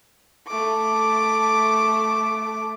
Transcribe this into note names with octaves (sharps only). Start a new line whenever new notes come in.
A3 D6